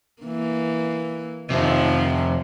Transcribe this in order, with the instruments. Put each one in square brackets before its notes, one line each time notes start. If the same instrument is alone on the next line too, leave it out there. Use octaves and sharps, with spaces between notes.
[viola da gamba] E3 A#3
[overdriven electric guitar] F2 C3 [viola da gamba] D#3 F3